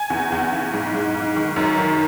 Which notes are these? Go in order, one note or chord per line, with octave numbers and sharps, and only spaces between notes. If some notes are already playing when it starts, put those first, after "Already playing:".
Already playing: G#5
E2
E2
E2
G#2
G#2
G#2
D#3
F#2
D#3